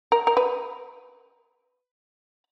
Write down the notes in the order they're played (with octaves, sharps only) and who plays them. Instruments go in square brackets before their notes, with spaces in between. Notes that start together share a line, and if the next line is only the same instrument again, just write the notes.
[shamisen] A#4
A#4
B4